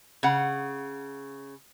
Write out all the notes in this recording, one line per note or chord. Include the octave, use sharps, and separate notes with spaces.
C#3 F#5